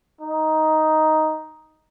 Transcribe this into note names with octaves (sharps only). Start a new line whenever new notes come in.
D#4